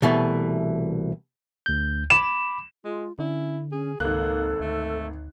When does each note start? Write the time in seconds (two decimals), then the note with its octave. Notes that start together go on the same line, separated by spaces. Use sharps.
0.02 C2 B2 E3 A3
1.66 D2 G6
2.10 B5 D6 E7
2.85 G#3 F4
3.19 D3 C#4 E4
3.72 C#4 G#4
4.00 G#1 C#2 A#3 A4 F#6
4.60 D2 A3